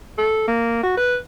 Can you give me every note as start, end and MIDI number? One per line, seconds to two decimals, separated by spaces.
0.18 0.44 69
0.48 0.82 58
0.84 0.94 66
0.97 1.15 71